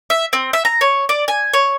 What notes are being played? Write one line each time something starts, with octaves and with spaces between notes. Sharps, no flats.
E5
C4
E5
A#5
C#5
D5
G#5
C#5